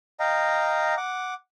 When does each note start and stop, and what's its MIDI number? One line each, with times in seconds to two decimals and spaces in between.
0.20 0.95 75
0.20 0.95 77
0.20 0.95 79
0.20 0.95 82
0.97 1.34 78
0.97 1.34 86